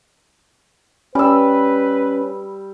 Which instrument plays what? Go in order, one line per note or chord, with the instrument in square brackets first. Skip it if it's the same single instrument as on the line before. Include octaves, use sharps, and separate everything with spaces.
[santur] G3 E6 [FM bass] C#4 [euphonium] B4